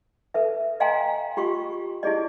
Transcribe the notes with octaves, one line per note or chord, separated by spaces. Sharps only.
A4 B4 E5
D#5 F5 G5 G#5 A#5 C6
F4 G4 C6 C#6
E4 G4 G#4 D5 D#5